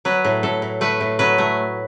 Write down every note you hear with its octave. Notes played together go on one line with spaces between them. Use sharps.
F#3 B4
A2
A2 A4
A2
A3 B4
A2
F#3 B4
A3